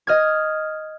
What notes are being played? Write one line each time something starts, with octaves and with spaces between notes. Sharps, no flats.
D#5 F6 G#6